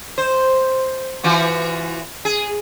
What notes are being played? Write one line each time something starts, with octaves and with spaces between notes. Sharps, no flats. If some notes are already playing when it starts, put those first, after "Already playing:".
C5
E3 F4 F#4
G#4